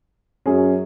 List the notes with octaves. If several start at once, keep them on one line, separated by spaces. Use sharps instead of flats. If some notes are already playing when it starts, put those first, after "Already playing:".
F#2 F#3 C#4 G#4